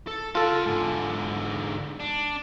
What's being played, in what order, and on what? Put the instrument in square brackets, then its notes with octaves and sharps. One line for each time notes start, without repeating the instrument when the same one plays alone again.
[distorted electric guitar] A4
[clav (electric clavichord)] F4 A4 [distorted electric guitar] F#5 A5
[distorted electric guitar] G#2 D3
D4